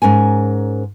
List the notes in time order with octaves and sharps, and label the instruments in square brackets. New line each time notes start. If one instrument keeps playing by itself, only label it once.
[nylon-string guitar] G#2 C#4 A#4 G#5